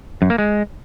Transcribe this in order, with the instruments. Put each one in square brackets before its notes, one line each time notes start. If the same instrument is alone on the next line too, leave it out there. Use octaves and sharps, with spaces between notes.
[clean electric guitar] F#2
A#3
G#3